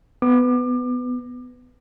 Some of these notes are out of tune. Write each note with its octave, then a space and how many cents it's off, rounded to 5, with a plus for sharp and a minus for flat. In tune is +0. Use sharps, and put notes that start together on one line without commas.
B3 +15 D6 +30